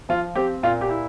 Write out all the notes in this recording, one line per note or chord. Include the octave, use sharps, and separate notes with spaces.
F3 F4
C4 G4
A#2 F4
G4
E4